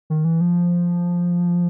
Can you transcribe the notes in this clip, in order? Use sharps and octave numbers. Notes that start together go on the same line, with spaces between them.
D#3
E3
F3